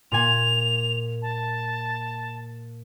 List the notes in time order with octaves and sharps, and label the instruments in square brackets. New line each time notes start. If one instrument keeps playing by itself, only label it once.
[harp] A#2 G#5 [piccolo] F7
[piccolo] A5